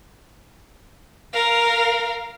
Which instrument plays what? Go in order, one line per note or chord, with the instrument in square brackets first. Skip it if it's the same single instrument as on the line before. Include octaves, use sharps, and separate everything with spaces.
[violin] A#4 F5